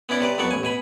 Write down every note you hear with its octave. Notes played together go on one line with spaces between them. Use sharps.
B3 C#4 E4 D5
C3 B4 D5
F2 F#3 B3 D5 C#6
A1 G#5
B2 G#5 B5